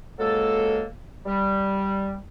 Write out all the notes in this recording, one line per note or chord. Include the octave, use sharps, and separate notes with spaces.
C#2 F#3 G#3 A#3 A4
G3